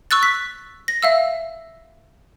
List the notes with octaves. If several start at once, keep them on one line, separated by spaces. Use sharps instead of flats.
C#6 E6 F#6 A6
B6
A#6
E5 F5 E6